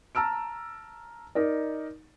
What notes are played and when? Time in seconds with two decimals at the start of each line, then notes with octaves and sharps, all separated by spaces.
0.15 A5 A#5 E6 F6 D7
1.35 D#4 A#4 D5